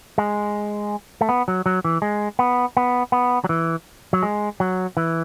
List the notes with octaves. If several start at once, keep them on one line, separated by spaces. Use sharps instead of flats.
G#3
A3
B3
F#3
F#3
E3
G#3
B3
B3
B3
F#3
E3
F#3
G#3
F#3
E3